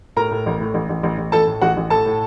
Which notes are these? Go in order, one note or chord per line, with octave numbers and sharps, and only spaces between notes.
A2 A#4 A#5
A2
A1
A2
A1
A1
A1
A1
A1 A4 A5
A2
A1 F#4 F#5
A1
A2 A4 A5
A2